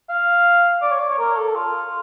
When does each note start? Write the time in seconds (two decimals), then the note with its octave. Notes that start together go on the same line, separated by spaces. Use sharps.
0.09 F5
0.82 D5
0.92 C#5
1.00 D5
1.10 C#5
1.19 A#4
1.36 A4
1.55 F4